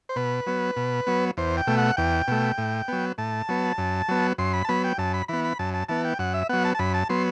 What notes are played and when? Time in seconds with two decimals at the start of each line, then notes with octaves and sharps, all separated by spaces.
0.09 C5
0.16 B2 B4
0.47 F#3 B3
0.76 B2
1.07 F#3 B3
1.37 E2 C5
1.57 G5
1.67 B2 A3
1.77 F#5
1.97 E2 G5
2.28 B2 A3
2.58 A2
2.88 F#3 B3
3.18 A2 A5
3.49 F#3 B3
3.78 F#2
4.09 F#3 B3
4.38 F#2 C6
4.53 B5
4.65 A5
4.69 F#3 B3 B5
4.84 G5
4.98 F#2 A5
5.14 B5
5.28 E3 B3 B5
5.44 B5
5.59 F#2 A5
5.74 A5
5.89 E3 B3 A5
6.05 G5
6.19 F#2 F#5
6.34 E5
6.49 F#3 B3 F#5
6.65 A5
6.75 A5
6.79 F#2 B5
6.94 A5
7.09 F#3 B3 C6